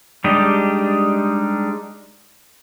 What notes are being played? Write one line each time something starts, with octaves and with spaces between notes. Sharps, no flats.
G3 G#3 D4 D#4 G4